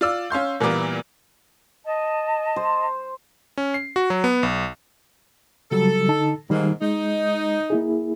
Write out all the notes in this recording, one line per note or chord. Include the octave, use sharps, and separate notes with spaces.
F4 D5 E6
C#4 F5 C6 G6
A#2 E3 G3 A#3 B3
D#5 A5
C5
C#4
C7
F#4
F#3
B3
B1
C#3 F#3 G3 A4
D3 D#4 A5
G#2 D#3 G3 A#3 D#4
G#3 D#4
A#3 E4 G#4